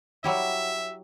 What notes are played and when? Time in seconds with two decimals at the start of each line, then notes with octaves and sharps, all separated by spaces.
0.24 F#3 G3 E4 E5